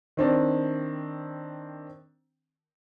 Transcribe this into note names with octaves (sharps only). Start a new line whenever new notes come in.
D#3 C4 D4